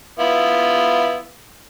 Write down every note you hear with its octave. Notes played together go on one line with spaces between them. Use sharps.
B3 E4 F4